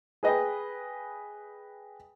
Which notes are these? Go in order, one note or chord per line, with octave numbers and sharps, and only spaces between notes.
G#4 B4 D#5 G5